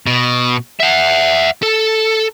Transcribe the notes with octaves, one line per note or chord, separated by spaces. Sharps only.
B2
E5 F#5
A4